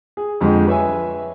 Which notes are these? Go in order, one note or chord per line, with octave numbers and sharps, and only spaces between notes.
G#4
F2 D3 G#3 G4
B4 C#5 E5 G#5